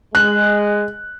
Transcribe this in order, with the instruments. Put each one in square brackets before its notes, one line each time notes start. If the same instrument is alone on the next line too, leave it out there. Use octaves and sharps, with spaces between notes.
[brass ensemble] G#3 [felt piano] F#6